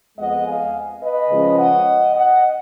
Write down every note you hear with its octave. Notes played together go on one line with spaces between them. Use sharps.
F2 F3 G#3 B3 D#5 F#5
F5 G#5
B4 D#5
C#3 F3 G#3 C#4
D#5 F#5
D#5 F#5